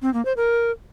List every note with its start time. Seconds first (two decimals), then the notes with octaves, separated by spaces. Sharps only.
0.02 C4
0.14 A#3
0.25 C5
0.37 A#4